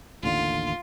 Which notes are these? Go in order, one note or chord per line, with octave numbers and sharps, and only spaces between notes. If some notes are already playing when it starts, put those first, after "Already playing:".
A1 D#2 D3 F4